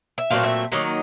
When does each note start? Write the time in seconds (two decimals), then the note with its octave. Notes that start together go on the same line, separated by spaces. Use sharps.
0.18 E5
0.30 A#2 F#3 A3 C4 F5
0.44 E5
0.72 D#3 F#3 A#3 D#4